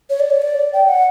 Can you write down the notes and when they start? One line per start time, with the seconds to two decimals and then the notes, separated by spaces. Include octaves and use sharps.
0.10 C#5
0.20 D5
0.30 C#5
0.42 D5
0.73 G5
0.89 F#5